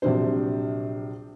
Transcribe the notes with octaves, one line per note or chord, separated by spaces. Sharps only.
A#1 C3 F#3 D4 C5